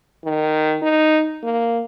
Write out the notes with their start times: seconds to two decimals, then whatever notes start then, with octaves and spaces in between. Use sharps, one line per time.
0.25 D#3
0.83 D#4
1.43 A#3